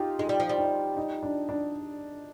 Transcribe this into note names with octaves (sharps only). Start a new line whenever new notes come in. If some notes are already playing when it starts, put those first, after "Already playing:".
Already playing: D#4 F4 G4
G#3 D#4
G3
F3
G3
D#4
D#4
D4
D4